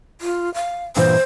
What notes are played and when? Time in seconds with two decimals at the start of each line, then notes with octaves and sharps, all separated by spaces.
0.21 F4
0.54 F5
0.96 G2 A#2 E3 C5